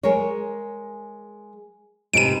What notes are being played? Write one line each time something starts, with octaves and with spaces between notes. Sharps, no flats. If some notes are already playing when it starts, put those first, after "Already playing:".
G#3 A#4 C#5
G#2 C3 B4 D7 D#7